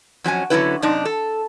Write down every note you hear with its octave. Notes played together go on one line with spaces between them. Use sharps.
F2 F#3 C#4 G#5
D3 F#3 B3 C#4 E4 B4
F#2 C3 D4 D#4
A4